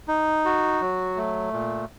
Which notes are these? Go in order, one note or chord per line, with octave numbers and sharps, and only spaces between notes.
D#4
F#4
F#3
A3
A#2